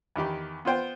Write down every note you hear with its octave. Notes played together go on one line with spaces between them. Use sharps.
E2 D#3 G4 B5
B3 F4 C5 G5